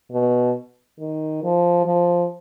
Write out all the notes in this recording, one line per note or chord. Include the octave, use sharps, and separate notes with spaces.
B2
D#3
F3
F3